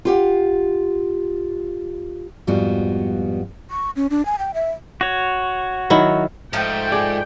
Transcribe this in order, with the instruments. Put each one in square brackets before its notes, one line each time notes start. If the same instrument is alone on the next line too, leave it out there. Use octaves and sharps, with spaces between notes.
[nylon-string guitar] F4 G4 F#5
[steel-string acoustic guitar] F2 G#2 G3 B3 F4 F#4
[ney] C#6
C#4
D4
G#5
G5
E5
[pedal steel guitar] F#4 C#5
[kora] D#3 F#3 E4
[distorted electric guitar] G#2 [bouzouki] F3 A3 [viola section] G5
[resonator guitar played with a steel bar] G#4 D5